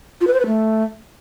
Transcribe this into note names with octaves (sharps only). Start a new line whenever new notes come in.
F4
B4
C5
B4
A3